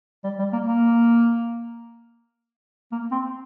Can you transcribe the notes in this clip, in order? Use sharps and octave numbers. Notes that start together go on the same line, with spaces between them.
G3
G3
A#3
A#3
A#3
C4